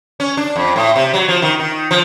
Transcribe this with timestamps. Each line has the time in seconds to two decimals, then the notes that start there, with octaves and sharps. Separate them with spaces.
0.20 C#4
0.37 D4
0.56 F2
0.76 A2
0.96 C3
1.13 F#3
1.28 F3
1.42 D#3
1.60 D#3
1.91 F3